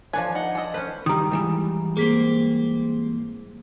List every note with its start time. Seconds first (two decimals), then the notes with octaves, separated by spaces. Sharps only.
0.13 F3 D4 B4 C#5 G#5
0.35 D#4 F#5
0.55 D4 A4 D#5
0.74 C#4 B4 C5
1.06 D#3 G3 A#5 D#6
1.32 G#2 E3 G3
1.97 A#3 C4 G#4 B6